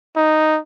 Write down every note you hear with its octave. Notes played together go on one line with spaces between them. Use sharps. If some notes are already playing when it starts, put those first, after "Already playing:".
D#4